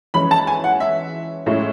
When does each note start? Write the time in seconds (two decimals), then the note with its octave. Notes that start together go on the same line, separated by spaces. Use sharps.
0.14 E3 G#3 C#4 B5
0.31 A5
0.47 G#5
0.64 F#5
0.80 E5
1.46 A2 G#3 C#4 E4